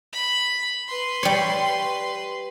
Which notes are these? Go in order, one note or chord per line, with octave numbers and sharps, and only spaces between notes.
B5
B4 C6
G3 C#5